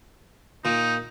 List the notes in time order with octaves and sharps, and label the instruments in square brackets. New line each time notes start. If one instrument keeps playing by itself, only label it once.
[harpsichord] A#2 [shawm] D#4